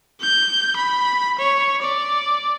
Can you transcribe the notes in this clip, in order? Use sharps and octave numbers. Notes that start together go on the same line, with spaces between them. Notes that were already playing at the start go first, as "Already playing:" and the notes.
G6
B5
C#5
D5